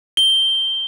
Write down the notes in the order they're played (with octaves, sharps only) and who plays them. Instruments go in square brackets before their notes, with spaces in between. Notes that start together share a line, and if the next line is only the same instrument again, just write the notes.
[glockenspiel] G7